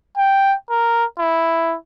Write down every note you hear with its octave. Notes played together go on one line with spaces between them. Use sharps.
G5
A#4
E4